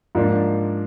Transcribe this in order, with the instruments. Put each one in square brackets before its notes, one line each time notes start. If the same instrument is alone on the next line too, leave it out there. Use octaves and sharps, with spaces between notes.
[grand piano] G#2 F3 A#3 D4